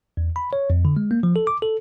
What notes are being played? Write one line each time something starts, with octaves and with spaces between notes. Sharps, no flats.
E2
B5
C#5
F2
D3
G#3
A#3
F3
A4
D6
A4